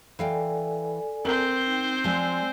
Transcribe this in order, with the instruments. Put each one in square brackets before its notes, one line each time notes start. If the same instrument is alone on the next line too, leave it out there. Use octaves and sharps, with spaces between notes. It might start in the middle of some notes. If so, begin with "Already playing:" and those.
[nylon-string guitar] E3 F5 G5 [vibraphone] A4 D5 G#5
[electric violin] C4 C5 [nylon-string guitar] A#4
[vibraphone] D#4 G5
[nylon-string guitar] F3 G#3 [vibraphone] D5 G#5 E6